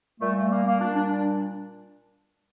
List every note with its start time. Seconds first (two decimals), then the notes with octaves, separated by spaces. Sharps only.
0.20 A#2 G3 A3
0.35 A3
0.50 A#3
0.66 A#3
0.80 A#2 G3 D4
0.95 D4
1.11 D4